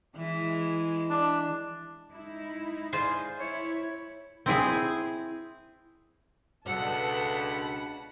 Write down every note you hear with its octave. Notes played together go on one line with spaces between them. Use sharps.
E3 G#3
D4
G#3 D#4 E4
F4 G#4 C5
E4 C#5
C4 E4 G#4
C#2 B2 D4 A4 F#5 A5 B5